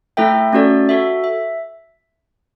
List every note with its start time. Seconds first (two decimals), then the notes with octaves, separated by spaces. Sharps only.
0.17 A3 E4 A4 E5 G5
0.53 A3 C#4 F#4 A4 D5
0.89 F#4 A4 E5
1.24 E5